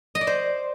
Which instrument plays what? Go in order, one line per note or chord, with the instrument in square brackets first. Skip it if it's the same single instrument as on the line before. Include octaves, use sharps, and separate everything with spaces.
[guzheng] D#5
D5
C5